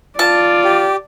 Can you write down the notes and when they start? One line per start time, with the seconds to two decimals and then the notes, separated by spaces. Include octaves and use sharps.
0.19 F4 D5 A5
0.64 G4